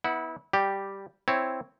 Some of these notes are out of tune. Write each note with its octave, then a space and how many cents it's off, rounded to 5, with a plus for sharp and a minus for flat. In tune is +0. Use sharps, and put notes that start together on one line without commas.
B3 +0 E4 -30 F#5 +0
G3 +0 G4 +0
C4 +0 E4 +0 C#5 +0